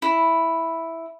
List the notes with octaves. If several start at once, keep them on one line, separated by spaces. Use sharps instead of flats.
E4